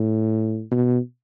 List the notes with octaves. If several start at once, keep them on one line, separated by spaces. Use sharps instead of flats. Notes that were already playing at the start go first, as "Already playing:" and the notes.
Already playing: A2
B2